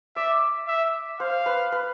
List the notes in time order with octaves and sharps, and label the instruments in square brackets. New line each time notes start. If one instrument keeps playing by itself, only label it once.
[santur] D5 [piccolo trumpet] E5
[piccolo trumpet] E5
[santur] C5 [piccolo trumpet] F5
[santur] B4
B4